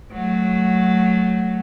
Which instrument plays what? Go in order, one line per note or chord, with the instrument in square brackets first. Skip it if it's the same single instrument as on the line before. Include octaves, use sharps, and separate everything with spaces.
[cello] F#3 A3